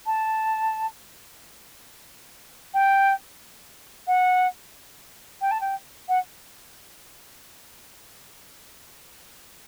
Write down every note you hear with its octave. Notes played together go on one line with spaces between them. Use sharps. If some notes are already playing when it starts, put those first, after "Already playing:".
A5
G5
F#5
G5
A5
G5
F#5